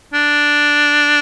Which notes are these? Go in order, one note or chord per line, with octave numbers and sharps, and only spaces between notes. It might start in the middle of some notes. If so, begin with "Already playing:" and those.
D4